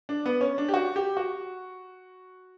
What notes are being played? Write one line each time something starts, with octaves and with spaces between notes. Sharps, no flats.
D4
B3
C#4
D4
G4
F#4
G4
F#4